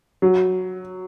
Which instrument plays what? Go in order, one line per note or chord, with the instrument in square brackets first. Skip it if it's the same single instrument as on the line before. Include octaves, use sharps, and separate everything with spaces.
[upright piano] F#3